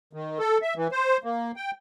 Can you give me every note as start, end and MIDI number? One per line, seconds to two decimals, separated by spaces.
0.13 0.39 51
0.39 0.58 69
0.62 0.74 76
0.76 0.88 52
0.92 1.17 72
1.24 1.52 58
1.56 1.71 79